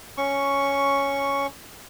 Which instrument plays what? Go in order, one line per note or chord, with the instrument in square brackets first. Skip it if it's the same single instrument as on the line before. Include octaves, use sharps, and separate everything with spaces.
[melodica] C#4 C#6